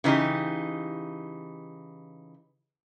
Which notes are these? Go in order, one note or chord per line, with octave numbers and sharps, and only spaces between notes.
C#3 E3 D#4 G4